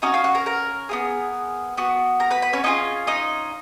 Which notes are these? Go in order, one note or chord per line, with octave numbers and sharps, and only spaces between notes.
C#4 D#4 F#4 D#5
F4 F5
F#4 F#5
A#4 A#5
A#4 A#5
B3 F4 G#4
B3 F#4
A#4 A#5
B4 B5
B4 B5
C#4 C#5
C#4 D#4 F4 G#4 D#5
D#4 D#5